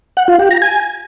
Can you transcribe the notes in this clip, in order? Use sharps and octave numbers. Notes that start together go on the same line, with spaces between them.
F#5
F4
G4
A#5
G#5